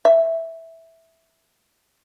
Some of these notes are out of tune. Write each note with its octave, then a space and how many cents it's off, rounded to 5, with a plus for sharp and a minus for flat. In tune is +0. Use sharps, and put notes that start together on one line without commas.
E5 -5